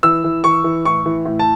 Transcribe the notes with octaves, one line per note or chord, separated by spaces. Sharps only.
E3 E6
E3
E3 C#6
E3
A2 C#6
E3
A2
A5